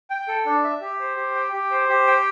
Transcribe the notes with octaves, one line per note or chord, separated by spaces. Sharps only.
G5
A4
D4
E5
G4
C5
G4
G5
G4
C5
G4
G5